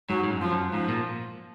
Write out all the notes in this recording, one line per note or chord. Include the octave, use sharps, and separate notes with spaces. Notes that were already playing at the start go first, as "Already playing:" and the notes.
G#2 F#3
G#2
F#2
F3
F#2
G#2 F3
A#2